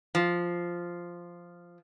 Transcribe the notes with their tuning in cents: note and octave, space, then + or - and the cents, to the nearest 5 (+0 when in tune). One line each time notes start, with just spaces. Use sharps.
F3 -5